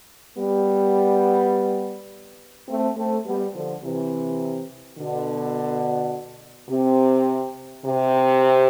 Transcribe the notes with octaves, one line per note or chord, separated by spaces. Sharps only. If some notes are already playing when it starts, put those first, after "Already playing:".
G3 B3
A3 C4
A3 C4
G3 B3
D3 F3
C3 E3
B2 D3
C3
C3